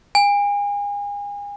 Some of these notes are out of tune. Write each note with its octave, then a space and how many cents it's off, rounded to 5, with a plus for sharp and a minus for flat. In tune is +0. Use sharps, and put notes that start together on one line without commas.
G#5 -35